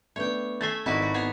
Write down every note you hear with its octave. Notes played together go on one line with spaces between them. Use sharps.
A3 B3 D4 C#5 G5
A3 E5 G#5 A6 C7
G#1 D#3 E4 F#4 B4 D#5
F#4
B3 G#4 C#5